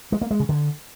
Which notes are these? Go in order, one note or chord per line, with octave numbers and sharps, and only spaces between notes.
G#3
A#3
G#3
C#3
D3